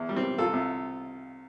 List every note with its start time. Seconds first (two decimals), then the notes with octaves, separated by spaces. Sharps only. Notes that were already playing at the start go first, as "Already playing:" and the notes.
Already playing: E2
0.09 G3
0.16 C4
0.23 G3
0.38 C2 F4 A4
0.53 C2